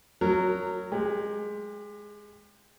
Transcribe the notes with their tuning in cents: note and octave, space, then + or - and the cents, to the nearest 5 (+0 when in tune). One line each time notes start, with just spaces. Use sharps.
F#3 +0 A#4 -20
G#3 +0 G4 +30